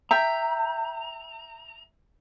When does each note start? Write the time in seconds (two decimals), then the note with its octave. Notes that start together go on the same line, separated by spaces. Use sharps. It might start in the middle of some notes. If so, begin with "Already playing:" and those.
0.11 E5 G5 A#5